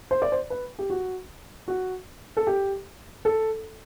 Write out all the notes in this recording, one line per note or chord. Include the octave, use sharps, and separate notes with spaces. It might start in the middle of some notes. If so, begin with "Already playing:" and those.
C5
D5
C5
B4
G4
F#4
F#4
A4
G4
A4